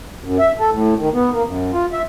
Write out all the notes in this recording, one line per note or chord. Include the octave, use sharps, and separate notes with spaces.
F#2
E5
A4
A2
D#3
B3
A#3
F#2
F4
E5